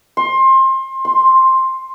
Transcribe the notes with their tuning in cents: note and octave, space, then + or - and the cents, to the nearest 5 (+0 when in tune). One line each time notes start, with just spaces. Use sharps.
C6 +25
C6 +10